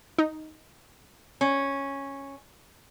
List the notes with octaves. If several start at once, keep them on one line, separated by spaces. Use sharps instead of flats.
D#4
C#4